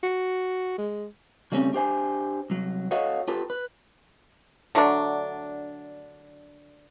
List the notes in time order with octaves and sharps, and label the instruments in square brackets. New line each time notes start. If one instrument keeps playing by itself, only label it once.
[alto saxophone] F#4
G#3
[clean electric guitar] C#3 G3 A3 C4 C#4
D4 G4 C5 G#5
C2 F#3
F#4 A4 C#5 D#5 F5 F#5
F4 G4 A4 B4
B4
[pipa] D3 F#3 A3 D4